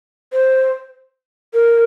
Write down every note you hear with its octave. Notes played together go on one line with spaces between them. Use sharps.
C5
A#4